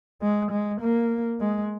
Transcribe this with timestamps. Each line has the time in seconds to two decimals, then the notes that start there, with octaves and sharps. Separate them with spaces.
0.22 G#3
0.51 G#3
0.81 A#3
1.40 G#3